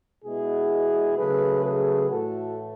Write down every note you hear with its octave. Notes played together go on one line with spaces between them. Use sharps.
B2 G#3 B3 E4 G#4
C#3 F#3 A3 G#4 B4
G#4 B4
A2 E3 A3 F#4 A4